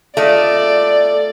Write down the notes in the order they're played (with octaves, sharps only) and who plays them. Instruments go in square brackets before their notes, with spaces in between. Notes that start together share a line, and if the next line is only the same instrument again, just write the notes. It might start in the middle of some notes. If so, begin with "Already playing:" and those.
[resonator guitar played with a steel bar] A3 F4 D#5 [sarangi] D5